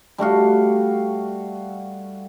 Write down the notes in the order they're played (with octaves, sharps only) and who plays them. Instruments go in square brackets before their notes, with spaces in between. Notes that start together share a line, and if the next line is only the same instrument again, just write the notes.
[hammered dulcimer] G3 A3 F#4 F5